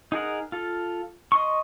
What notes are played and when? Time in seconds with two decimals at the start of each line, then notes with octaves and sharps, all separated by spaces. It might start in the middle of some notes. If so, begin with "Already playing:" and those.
0.12 D#4 G#4 A#4 F#5
0.52 F4 A4
1.32 D#5 C6 C#6